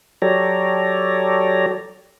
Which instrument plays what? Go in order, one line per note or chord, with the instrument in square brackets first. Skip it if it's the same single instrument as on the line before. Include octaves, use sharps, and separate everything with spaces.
[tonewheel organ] F#3 G4 A4 C#5 D5 A#5